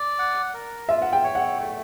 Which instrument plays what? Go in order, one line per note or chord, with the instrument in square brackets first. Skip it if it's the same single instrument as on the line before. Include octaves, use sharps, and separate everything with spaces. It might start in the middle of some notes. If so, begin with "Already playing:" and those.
Already playing: [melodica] D5
F#5
A#4
[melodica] F4 [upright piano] E5
[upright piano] F#5
G5
[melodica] C#5
[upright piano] F#5
[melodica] A3